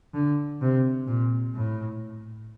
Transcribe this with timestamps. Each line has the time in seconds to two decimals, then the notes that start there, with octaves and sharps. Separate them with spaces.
0.14 D3
0.62 C3
1.08 A#2
1.55 A2